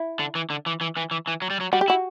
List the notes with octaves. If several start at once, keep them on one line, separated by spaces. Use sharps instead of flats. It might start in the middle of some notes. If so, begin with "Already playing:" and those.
Already playing: E4
D3
E3
D3
E3
E3
E3
E3
E3
F#3
G3
F#3
G3 F#4
G4
E4 F#4